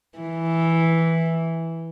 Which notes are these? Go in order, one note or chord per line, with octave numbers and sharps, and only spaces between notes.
E3